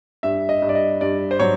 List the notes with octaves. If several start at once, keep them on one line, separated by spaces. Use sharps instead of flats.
G2 E5
D#5
G2
D5
D#5
G2 D5
C5
F#3 C#5